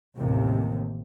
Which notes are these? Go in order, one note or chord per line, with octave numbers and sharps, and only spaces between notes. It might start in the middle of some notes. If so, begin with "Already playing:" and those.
A1 D#2 C3